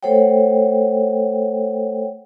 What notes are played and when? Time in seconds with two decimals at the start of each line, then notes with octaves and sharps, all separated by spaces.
0.03 A3 A4 C5 C#5 F#5 G5